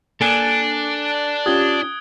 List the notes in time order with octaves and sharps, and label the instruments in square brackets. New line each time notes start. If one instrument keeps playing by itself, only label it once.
[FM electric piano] A#3 [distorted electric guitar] D4 [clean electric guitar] A4 G#5 [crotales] F#6 D7 G7
[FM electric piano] C#4 F4 G4 [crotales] D#6 G#6 G7